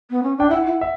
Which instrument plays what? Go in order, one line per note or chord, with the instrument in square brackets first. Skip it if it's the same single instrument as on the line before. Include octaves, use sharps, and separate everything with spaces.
[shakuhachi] B3
C#4
[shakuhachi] D4 [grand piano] G5
[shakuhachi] E4 [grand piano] F#5
[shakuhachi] E4
[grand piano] E5